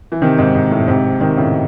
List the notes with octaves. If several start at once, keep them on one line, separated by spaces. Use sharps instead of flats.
E3
C3 D#3
G#2 C3
G#2
A2
G#2 C3
C3 D#3
A2 C#3